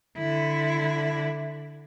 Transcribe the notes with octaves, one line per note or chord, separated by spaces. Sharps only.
D3 E4